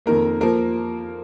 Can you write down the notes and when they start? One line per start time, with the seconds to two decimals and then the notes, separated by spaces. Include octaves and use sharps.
0.06 F2 D#3 A#3 A#4
0.41 F3 A#3 A#4